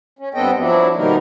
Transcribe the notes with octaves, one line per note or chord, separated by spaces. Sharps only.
C#4
G2 B3 C4 A4 D#5 G5
F3 F#3 D4 E4
B2 D#3 G3 A#3 D#4 A#4